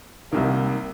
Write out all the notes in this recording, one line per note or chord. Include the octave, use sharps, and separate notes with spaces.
C2 C3 D#3 A#3